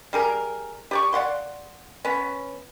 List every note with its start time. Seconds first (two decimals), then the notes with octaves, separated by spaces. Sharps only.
0.13 G3 G#4 A#4
0.91 G4 D5 C#6
1.13 D5 F5 F#5 C6
2.05 B3 C#4